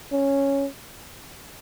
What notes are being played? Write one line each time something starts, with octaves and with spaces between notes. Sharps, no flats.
C#4